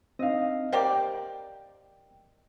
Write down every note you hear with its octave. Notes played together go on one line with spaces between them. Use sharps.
C4 D4 D#4 D#5 F5
A#3 G4 C5 D5
G5